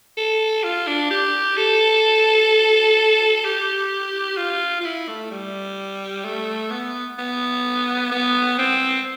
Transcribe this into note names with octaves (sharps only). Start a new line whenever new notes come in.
A4
F4
D4
G4
A4
G4
F4
F4
E4
A3
G3
A3
B3
B3
B3
C4